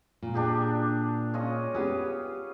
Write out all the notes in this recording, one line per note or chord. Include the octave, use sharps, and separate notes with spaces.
A#2
D4 G4 G#4
C#4 F4 D#5
B3 G4 G#4 B4